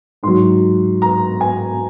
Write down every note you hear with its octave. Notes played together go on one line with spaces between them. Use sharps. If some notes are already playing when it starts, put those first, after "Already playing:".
G#2 F#3 C6
A#5
G#5